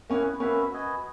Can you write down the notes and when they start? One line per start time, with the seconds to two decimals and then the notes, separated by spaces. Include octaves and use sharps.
0.10 A#3 B3 C#4 E4 B4 F#5
0.40 A#3 C#4 F#4 B4 E5
0.71 F#4 B4 D#5 G#5